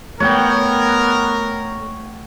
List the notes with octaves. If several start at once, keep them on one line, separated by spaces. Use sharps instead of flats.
A3 B3 A#4 C#5 F#5 G5